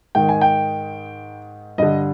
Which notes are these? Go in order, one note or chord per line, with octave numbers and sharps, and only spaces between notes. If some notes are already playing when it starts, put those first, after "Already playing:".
G#2 D#3 G5
G#5
G5
G2 D3 D#5